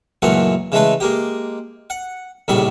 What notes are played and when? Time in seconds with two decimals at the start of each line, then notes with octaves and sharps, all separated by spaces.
0.22 C#2 F#2 A#2 E3 A3 F#5
0.72 C#3 E3 G#3 A3 A4 B4
1.00 G#3 A#3 G4
1.90 F#5
2.48 A#1 F2 A2 C#3 G3 B5